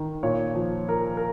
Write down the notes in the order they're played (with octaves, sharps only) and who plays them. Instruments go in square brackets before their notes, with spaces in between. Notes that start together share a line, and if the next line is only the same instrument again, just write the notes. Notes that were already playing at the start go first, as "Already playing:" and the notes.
Already playing: [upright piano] D#3
A#2 C#5
F3
F3 A#4
A#4